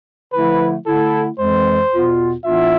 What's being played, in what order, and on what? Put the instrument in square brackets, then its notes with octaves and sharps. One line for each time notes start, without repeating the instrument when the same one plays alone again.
[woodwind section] D3 F3 A3 E4 [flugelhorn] B4
[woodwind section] D3 A3 E4 [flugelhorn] A4
[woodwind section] F2 E3 G#3 [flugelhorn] C5
[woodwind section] E2 B2 B3 F4
[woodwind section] A2 E3 B3 D4 F4 [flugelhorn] E5